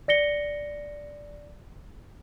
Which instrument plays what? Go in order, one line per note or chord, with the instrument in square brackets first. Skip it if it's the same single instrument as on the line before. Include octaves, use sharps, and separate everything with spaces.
[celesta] D5 A#6 C#7 G7